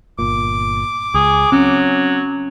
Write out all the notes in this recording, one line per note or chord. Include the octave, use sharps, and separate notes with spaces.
G1 A#2 D6
C#2 G#4
F#3 C4 C#4